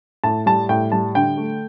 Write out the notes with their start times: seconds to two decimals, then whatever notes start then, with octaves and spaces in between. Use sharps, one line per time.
0.24 A2 A5
0.46 G3 A5
0.69 A2 G5
0.92 G3 A5
1.15 D3 G5
1.37 A3